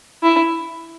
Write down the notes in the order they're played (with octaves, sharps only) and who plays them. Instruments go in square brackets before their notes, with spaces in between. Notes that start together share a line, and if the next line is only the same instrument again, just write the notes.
[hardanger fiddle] E4